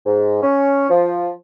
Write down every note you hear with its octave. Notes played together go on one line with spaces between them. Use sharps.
G#2
C#4
F3